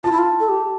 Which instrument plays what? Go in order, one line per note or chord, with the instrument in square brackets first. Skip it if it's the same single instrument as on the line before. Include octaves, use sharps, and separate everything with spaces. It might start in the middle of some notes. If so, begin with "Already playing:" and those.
[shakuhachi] F4 [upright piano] A5
[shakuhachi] E4
F4
A4
G4